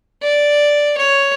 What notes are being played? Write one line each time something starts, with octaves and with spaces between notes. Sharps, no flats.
D5
C#5